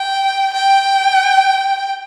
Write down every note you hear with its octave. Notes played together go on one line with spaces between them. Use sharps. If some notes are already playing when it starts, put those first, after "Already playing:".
Already playing: G5
G5